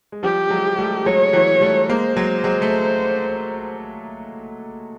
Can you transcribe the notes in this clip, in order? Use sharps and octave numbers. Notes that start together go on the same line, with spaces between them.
G#3
F3 G3 G4
F#3 G#3
G3 A3
F#3 G#3 C#5
E3 F#3
G3 A3
G#3 A#3 C5
F#3 G#3
F#3 G#3
A3